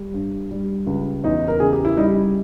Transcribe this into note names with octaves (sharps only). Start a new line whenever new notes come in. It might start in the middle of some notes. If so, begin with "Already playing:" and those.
Already playing: G3
G2
G3
C#2
E2 D#4
A#4
C#3 G#4
G4
E4
G3 D#4